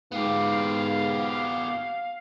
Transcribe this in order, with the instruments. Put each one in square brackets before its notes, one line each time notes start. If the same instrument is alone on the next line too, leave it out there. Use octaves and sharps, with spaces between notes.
[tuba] G#2 [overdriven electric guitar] B3 G4 [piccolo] F5